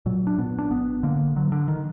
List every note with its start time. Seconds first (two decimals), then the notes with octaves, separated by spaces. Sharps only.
0.06 A#2 F#3
0.27 D4
0.38 A#2 B3
0.59 D4
0.70 G#1 B3
1.03 D3 A#3
1.36 D3 F#3
1.52 D3
1.68 D#3